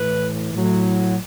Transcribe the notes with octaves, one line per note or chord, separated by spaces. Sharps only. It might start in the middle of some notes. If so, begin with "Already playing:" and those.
Already playing: A2 E3 B4
A2 F#3